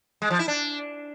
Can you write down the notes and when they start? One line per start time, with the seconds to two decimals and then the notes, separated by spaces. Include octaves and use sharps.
0.22 G#3
0.30 F3
0.39 E4
0.48 D4